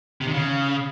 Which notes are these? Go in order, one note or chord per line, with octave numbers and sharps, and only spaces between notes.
C3
D#3
C#3